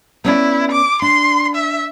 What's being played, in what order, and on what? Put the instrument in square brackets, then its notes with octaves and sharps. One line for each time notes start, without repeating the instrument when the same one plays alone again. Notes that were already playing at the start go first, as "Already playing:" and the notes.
[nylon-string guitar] B3 C#4 D5 [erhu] E4
[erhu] D6
[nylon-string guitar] D4 [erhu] C6
[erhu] E5